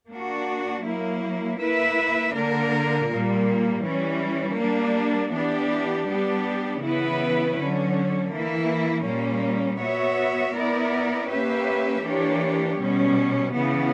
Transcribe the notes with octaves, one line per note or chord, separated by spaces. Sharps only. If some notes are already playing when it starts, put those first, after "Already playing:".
A#3 D4 F#4
F#3 A#3 E4
A#3 E4 B4 E5
D3 A#3 D4 A#4
A#2 G3 A#3
E3 G3 C#4
G3 A#3 D4
E3 B3 D4 G4
G3 B3 D4 G4
C#3 E3 B3 E4 B4
D3 F#3 C#4
E3 A#3 E4
A#2 G3 A#3 C#4
B3 F#4 C#5 E5
B3 E4 A#4 D5
A#3 C#4 G4 B4 E5
E3 A#3 D4 G4 C#5
B2 G3 C#4
C#3 E3 B3